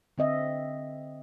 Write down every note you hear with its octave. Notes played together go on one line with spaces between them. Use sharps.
D3 C4 D#5 E5